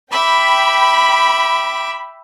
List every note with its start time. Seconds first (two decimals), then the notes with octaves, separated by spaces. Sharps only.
0.12 E5 G5 B5 D6